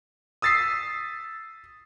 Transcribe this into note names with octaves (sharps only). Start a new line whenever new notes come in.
D#6 E6 A6 B6 C7